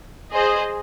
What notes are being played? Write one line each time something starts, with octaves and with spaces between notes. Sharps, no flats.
G#4 C5 D#5